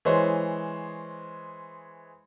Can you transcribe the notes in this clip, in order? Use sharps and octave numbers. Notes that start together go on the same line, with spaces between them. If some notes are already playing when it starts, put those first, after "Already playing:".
E3 G#3 G#4 C5 C#5